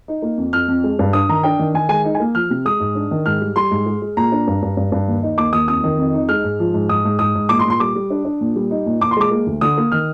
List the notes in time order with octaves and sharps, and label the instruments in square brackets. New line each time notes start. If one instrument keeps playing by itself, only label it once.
[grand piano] D#4
A#3
F2
F2 F6
F2
G#3
G2
D4 D#6
D#3 A#5
D4 G5
D#3
D#3 G#5
G#3 G#5
D#4
G#5
A#3
F3 F6
C3
G#3 D#6
G#2
D4
D#3
G#2 F6
G3
G3 C6
G#2
G#3
G#3
A#2 A#5
D4
G2
G2
G2
G2
D#2
D#4
D#2 D6
D#2 D#6
F2 D#6
D#3
F2
D#4
G#3 F6
G#2
F3
G#2
G#2 D#6
G#2
G#2 D#6
G#2
A#2 D6
C6
A#2
C6
G3 D6
G3
D4
D4
A#2
G3
D#4
A#2
A#2 D6
C6
G#3 D6
A#3
D2
D3 D#6
A#3
D#3 F6